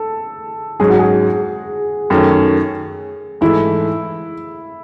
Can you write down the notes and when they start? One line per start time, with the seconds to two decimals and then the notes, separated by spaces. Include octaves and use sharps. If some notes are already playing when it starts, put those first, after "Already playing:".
Already playing: A4
0.80 G#2 F#3 C#4 G#4
0.90 F#4
0.99 G#4
2.10 F#2 D#3 A3 C#4
3.41 G#2 E3 A3 E4